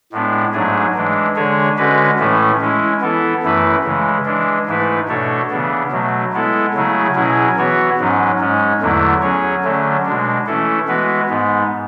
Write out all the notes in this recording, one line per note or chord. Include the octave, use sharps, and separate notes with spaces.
A2 G#3 B3 D4
G#2 F#3 A3 D4 G#4
E3 G#3 D4
D3 G#3 D4 G#4 C#5
D3 G#3 C#4 F#4 B4
A2 E3 A3 C#4 E4
G#3 C#4 E4
E3 B3 E4 A4
F#2 E3 A3 E4 B4
C#3 E3 G#3
E3 G#3 D4
G#2 E3 A3 E4 B4
B2 A3 D4 A4 C#5
C#3 E3 B3 D4
B2 F#3 A3
G#3 B3 E4 A4
C#3 F#3 A3 E4 G#4
B2 F#3 C#4 E4 G#4
E3 B3 F#4 C#5
G#2 F#3 C#4
G#2 G#3 C#4
E2 D3 F#3 A3 E4
F#3 C#4 G#4 C#5
D3 F#3 A3 C#4
B2 G#3 D4
E3 A3 C#4 E4 A4
E3 G#3 B3 F#4 B4
G#2 G#3 B3